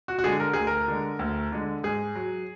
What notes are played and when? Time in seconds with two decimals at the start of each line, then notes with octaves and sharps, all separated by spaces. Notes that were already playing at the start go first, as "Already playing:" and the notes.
0.08 F#4
0.19 F#4
0.24 D3 G#3 G#4
0.40 A#4
0.53 D2 G#4
0.67 A#4
0.88 D3 G#3
1.19 D2
1.52 D3 G#3
1.84 G#2 G#4
2.15 F#3